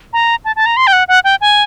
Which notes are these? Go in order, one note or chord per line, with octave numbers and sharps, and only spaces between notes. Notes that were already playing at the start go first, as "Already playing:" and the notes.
A#5
A5
A5
A#5
C6
G5
F#5
F#5
G5
G#5